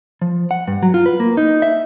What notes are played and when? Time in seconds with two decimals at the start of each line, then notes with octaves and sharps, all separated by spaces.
0.21 F3
0.51 F#5
0.68 G2
0.83 F#3
0.94 F4
1.06 B4
1.20 A#3
1.37 D#4
1.62 E5